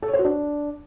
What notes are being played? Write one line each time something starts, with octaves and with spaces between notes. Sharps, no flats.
A4
C#5
C5
F#4
D4